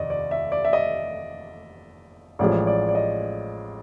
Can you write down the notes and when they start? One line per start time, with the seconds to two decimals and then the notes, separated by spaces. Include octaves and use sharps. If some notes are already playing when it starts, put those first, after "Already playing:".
Already playing: F1 D#2 D5 D#5
0.10 D5
0.31 E5
0.52 D5
0.65 E5
0.73 D#5
2.39 A1 A2 F3 G#3 D5
2.67 D5
2.89 D5
2.95 D#5